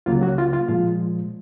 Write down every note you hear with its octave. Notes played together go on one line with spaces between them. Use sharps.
C#2 C#3 F#3 A#3 F4
F#3 F#4
F4
F4
A#2 F3 G#3 F4